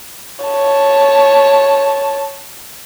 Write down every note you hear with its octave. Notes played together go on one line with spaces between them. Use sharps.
C#5 A5